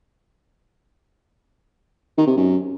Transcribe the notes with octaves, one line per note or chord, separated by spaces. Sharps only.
D#3
C3
F#2